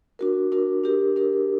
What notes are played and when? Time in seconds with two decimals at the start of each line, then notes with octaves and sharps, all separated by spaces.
0.19 D4 F#4 A#4
0.52 D4 F#4 A#4
0.84 D4 G4 A#4
1.16 D4 G4 A#4